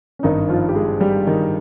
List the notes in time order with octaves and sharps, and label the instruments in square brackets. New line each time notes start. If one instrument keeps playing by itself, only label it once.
[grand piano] C#4
G#1 G2 D#3 D#4
F3 F4
G4
G#3 G#4
G3 G4
D#3 D#4